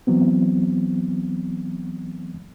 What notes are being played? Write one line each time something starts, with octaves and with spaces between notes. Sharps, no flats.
E3 F#3 B3 C4